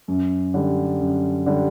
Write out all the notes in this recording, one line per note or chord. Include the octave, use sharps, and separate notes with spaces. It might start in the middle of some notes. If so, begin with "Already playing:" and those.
F#2
D3 G3
F#2
D3 G3